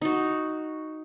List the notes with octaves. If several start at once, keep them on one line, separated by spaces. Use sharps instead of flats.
D#4 F#4